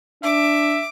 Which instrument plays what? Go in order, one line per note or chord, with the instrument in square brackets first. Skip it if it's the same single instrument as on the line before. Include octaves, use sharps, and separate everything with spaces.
[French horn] D4 [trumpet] E5 [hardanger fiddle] D6